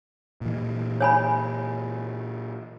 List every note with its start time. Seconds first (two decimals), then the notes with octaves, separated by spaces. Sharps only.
0.41 A#2 E3
1.01 C#5 G#5 B5